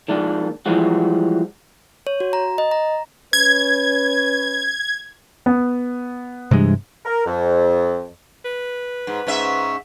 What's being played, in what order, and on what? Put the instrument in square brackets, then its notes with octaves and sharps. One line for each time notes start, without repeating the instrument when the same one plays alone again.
[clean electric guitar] D#3 F3 G#3 A#3 D4
E3 F3 G3 G#3 F#4
[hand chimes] C#5
F#4
A#5
D#5
A#5
[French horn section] C#4 B4 [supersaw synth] G#6
[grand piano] B3
[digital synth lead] G2 [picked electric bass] C3 E3 G#3
[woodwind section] A#4
F2
[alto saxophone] B4
[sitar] G#2
G#2 C#4 E5